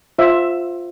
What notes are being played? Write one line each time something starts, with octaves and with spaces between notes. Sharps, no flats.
F4 C5 E5